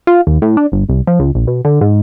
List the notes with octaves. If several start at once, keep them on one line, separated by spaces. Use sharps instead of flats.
F4
D#2
A2
D4
G1
C2
F3
C#2
A#1
B2
D3
G#2